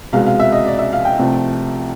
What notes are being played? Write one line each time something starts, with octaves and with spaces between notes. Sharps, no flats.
C2 B2 G#3 F5
F5
E5
D#5
D5
E5
F5
G5
C2 C3 F3 A3